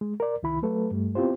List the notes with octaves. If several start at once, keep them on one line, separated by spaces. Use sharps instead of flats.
G#3
A#4 D5
C2 D#3 E4 B5
F#3 A3 A4 B4
G2 G3 A3
B3 C4 E4 F4 G4 C5